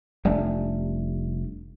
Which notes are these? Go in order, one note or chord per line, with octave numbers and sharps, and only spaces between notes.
F1 G3 A3 D4